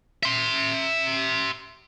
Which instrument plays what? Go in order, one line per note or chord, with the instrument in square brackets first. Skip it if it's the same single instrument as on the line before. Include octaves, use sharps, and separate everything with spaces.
[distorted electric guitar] E5 C6